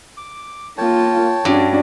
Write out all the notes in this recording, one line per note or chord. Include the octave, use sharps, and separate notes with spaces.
D6
A#3 F4 C#5 G5 A5
G2 C#4 D4 F#4